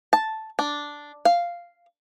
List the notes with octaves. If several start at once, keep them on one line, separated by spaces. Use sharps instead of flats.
A5
D4
F5